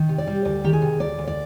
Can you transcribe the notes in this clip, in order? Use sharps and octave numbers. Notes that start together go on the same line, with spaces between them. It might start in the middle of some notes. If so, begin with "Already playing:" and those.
Already playing: D#3
C3
D5
G3
D2 D5
D#3 G4
G#4
C3
D2 D5
D2
D5